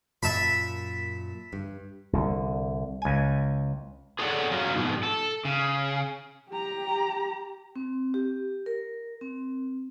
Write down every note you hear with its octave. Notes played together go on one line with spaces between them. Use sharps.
F#2 A#2 E5 A5 B5
G2
C2 D3
C#2 G#5
G#4 A4 C#5 D5 F#5
F#3 C#4 F4
G#2 B2 F3
A4
C#3
G4 A#5
C4
G4
A#4
C4